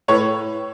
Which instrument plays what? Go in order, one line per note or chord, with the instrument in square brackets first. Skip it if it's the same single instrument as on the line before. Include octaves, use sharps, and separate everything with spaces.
[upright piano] A2 B4 C#5